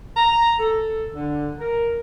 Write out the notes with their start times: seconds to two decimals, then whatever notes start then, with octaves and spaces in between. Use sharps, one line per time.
0.17 A#5
0.59 A4
1.15 D3
1.59 A#4